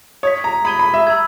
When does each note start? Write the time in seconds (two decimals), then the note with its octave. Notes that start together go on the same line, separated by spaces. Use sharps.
0.23 C#5 D#6 G#6 B6
0.44 A#5
0.65 B5 D#6 G#6 D#7 G7
0.79 B5
0.94 E5
1.07 B5 E6 G#6